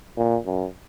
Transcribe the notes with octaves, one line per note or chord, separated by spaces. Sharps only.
A#2
F#2